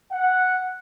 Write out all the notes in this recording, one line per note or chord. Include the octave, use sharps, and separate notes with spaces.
F#5